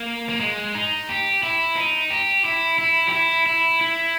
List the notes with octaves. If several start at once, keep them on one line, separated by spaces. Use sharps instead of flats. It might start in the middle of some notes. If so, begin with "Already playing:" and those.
Already playing: A#3
A#3
G#3
D#4
G4
E4
D#4
G4
E4
E4
G4
E4
E4
E4